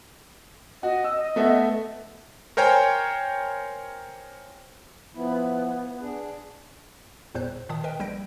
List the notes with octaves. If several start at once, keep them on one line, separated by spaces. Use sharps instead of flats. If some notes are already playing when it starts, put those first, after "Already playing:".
F#4 D#5
E6
D#5
A3 B3 E5
A#4 C5 C#5 G5 G#5 A#5
F3 B3 E4
D4 G#4
G1 E2 A#2 C5 F#6 G6
A#2 D#3 A5 D#6
A#4 B4 D#5 G5
A#1 G3 G6 A#6 D7